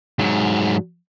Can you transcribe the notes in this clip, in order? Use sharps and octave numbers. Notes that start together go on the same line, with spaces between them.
G#2 F#3